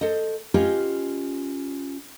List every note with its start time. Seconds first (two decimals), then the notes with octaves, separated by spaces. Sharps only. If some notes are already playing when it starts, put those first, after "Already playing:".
0.01 A4 C5 D#5
0.54 C#4 F4 G4 B4 D#5 G#5